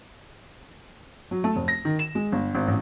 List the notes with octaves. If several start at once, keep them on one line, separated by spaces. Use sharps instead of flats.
F#3
A3
F1
A#6
D#3
E7
G#3
G1
G#1
A1